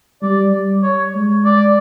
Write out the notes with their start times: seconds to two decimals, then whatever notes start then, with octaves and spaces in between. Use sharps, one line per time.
0.22 G3 D5
0.53 G3
0.83 C#5
1.15 G#3
1.45 D5